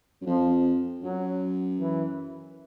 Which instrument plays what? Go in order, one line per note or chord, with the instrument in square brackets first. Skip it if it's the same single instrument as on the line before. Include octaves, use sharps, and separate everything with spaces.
[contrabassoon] F#2
[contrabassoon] F2 [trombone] F3
[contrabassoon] F#2 [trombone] F#3
[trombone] E3